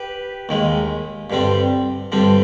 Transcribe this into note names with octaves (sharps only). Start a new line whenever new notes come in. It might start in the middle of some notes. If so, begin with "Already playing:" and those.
Already playing: G4 B4
D#2 D#3 G#3
G2 D3 G3 C4
G2 D3 G3 C4